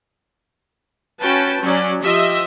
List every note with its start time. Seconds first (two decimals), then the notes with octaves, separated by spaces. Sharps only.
1.21 C#4 F#4 B4 G5 A5
1.61 F#3 C#4 D5
2.03 F3 G4 D#5 E5